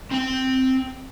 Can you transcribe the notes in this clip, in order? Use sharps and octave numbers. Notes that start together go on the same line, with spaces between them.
C4 G5